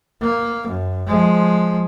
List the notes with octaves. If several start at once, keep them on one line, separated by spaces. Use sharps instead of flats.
A#3
F#2
F3 G#3